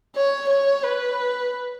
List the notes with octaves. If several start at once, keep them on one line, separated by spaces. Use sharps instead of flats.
C#5
C#5
B4